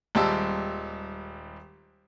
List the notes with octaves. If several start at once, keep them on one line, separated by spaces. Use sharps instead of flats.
D#1 G3 G#3 G4 A5 E6